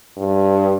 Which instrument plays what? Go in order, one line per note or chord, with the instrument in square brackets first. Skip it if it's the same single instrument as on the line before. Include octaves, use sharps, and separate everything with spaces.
[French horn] G2